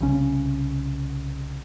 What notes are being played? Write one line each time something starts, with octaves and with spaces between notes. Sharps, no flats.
C2 C#3 C#4